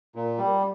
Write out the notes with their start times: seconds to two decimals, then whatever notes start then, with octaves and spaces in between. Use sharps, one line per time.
0.16 A#2
0.38 G3